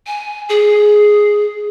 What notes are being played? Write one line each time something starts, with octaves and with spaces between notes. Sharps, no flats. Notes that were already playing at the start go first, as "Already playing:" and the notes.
G#5
G#4